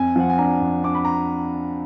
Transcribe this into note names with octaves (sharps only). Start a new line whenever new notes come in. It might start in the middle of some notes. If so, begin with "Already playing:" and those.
Already playing: F2 G#5
F3 F#5
G#5
D4 A#5
F2
D4 D6
B5
A#5